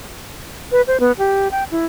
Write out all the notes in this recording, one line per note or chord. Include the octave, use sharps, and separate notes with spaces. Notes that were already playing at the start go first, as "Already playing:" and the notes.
B4
C5
B3
G4
G5
E4